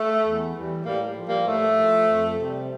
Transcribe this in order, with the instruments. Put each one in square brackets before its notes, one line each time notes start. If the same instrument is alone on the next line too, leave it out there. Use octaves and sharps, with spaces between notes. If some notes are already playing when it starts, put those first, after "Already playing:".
Already playing: [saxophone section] A3
E2
E3 G3
A2 G3 A#3
F3
G3 A#3
A2 A3
F3
F2
C3 G3